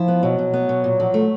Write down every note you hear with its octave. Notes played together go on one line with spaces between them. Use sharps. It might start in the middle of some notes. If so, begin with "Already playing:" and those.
Already playing: F3 E4
B3
B2 F#3
B2
B3
B2
A#2
F3
A3